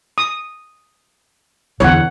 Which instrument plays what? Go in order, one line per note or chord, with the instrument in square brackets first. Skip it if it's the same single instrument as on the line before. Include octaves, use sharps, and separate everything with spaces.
[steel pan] D#6
[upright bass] E2 D3 [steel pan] C#5 F#5